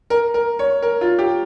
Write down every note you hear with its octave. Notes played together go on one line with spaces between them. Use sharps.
A#4
A#4
C#5
A#4
F4
G4